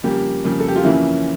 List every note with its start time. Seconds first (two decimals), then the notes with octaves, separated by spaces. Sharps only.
0.04 F2 C#3 G3 A#3 G4
0.44 F2 C#3 G3 A#3
0.60 A4
0.68 G4
0.76 F4
0.84 F2 C#3 E3 A#3 C#4 E4